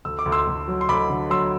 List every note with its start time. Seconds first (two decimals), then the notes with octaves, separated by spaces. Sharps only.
0.05 D2 E6
0.19 D6
0.26 D2
0.32 C6 E6
0.47 D2
0.68 F#3
0.81 C6
0.89 D2 B5 D6
1.10 D3
1.30 F#3 C6 E6